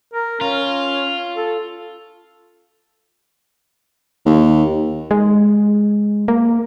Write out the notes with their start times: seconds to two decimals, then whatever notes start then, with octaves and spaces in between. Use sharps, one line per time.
0.14 A#4
0.41 C#4 F4
1.36 A4
4.26 D#2
5.11 G#3
6.28 A#3